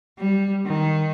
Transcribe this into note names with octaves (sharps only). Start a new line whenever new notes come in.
G3
D#3